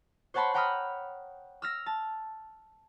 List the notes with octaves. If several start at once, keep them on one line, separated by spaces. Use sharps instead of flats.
C5 C#5 F#5 A5 B5 C6
F#5 G5 A#5 B5 D#6 F6
E6 F6 A#6
A5